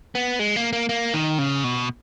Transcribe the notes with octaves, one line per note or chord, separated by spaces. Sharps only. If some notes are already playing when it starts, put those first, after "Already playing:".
B3
G#3
A#3
A#3
A#3
D#3
C#3
B2